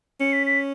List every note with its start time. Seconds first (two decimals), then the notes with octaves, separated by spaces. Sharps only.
0.20 C#4 C#7
0.33 B6
0.47 B6